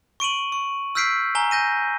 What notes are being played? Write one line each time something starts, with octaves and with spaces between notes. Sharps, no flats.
C#6 D7 D#7 F#7
C#6
E6 F6 G6 B6 C7 D7
G#5 A#5 G7
G6 A#6 D#7